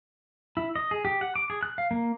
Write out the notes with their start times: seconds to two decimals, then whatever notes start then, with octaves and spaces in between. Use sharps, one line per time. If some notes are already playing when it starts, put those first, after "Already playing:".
0.57 E4
0.76 D#5
0.91 G#4
1.05 G4
1.21 F#5
1.36 D6
1.50 G#4
1.63 F#6
1.78 F5
1.91 A#3